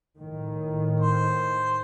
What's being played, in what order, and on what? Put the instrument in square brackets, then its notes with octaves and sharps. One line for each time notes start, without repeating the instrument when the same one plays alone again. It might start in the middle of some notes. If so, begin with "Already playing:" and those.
[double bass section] A2 D#3
[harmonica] C5